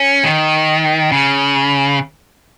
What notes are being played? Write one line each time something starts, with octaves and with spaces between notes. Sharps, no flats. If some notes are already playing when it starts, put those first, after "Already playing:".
Already playing: C#4
D#3
C#3